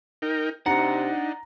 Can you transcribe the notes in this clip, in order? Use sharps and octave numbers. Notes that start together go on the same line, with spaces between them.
D#4 A#4 G5
C3 D4 D#4 F#5 A#5